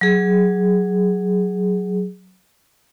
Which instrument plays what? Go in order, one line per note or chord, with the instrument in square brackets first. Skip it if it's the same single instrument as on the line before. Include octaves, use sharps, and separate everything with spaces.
[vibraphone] F#3 G#4